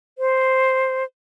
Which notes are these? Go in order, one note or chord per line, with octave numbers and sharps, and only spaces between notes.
C5